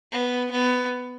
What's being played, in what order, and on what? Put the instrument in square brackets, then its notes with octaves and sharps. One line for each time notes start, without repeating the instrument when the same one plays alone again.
[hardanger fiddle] B3
B3